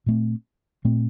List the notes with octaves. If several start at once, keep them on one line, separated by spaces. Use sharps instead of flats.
A#2 A3 C4
A#2 A3 C4